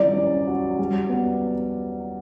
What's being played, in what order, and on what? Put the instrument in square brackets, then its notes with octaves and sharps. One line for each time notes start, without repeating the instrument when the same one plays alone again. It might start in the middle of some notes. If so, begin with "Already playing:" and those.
Already playing: [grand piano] G3 E4 [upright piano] D5
[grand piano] C#4
F#4
G3
B3